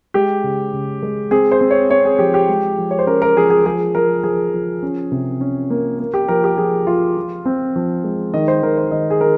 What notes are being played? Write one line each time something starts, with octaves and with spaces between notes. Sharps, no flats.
G#3 G4
C#3
C#3
G#3
C4 G#4
C5
C4
C#5
C4 C#5
G#4
F3 G4
G4
G#3
F3
C#5
C5
C#4 A#4
A#4
F3 G#4
G#4
F3 G#4
F3 A#4
F3 G#4
F3
C#4
C3
C#4
A#3
A#3
G4
F3 A#4
G4
F3 G#4
F3 F4
F3
C4
F3
G#3
D#3 D#5
C5
D#3 A#4
C5
D#3 D#5
G#4
D#3 A#4